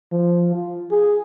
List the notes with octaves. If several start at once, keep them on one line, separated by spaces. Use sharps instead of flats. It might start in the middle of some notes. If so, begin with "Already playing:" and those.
F3
F4
G#4